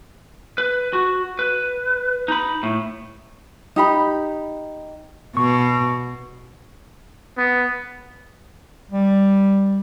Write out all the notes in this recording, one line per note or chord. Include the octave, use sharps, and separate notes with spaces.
B4
F#4
B4
D#4 B5
A2
D#4 G4 B5
B2 C#6
B3
G3